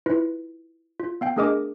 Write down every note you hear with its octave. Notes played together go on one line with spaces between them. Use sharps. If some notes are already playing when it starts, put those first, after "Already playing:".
E4 F4 B4
F4
B3 F5 G5
A3 D4 G#4 A#4 D#5 D6